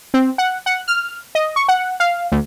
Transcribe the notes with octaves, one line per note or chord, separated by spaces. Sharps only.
C4
F#5
F#5
F6
D#5
C#6
F#5
F5
D2